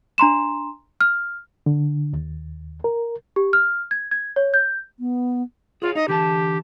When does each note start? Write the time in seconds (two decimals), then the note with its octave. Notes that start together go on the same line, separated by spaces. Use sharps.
0.18 D4 A#5 C6 E7
1.01 F6
1.66 D3
2.13 D#2
2.84 A#4
3.36 G4
3.53 F6
3.91 G#6
4.11 G#6
4.36 C#5
4.54 G6
4.99 B3
5.82 F4 G#4 C#5 F5
5.95 D#4 D#5
6.08 D3 E3 G4 A5